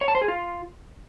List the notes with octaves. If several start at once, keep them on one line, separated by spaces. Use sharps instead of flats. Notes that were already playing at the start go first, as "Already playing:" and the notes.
C#5
A5
C5
G#4
F4